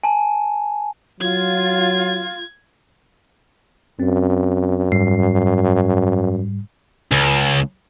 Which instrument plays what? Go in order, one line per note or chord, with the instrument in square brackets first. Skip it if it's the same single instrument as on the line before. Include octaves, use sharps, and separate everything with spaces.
[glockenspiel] G#5 A5
[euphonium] F#3 [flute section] F4 [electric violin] G#6
[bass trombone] F#2 [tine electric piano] C4
[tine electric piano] G#2 G3 C7
[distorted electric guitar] C#2